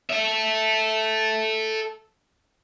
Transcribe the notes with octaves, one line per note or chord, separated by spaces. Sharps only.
A4 E5